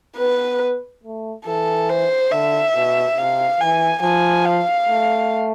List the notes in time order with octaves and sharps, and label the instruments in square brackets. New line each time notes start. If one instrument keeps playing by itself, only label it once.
[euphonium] B3 [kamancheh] B4
[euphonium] A3
[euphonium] E3 [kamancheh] A4
[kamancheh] C5
[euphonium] D3 [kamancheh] E5
[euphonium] B2
[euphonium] C3 [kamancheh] F5
[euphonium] E3 [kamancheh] G#5
[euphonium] F3 [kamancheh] G#5
[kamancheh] F5
[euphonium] A3